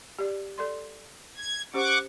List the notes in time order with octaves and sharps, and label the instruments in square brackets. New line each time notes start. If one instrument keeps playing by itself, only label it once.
[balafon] G4 D5
A4 D5 C6
[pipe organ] G#6
[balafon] C#4 G4 C5 [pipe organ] F#5 C#6 D6